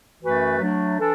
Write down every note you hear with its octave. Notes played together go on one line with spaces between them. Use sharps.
F#2 E3 A3 F#4 B4
F#3 A3 D4
E3 D4 A4